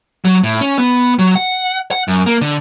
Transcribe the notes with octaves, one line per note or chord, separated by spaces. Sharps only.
F#3
A2
C#4
B3
F#3
F#5
F#5
F#2
A#3
D3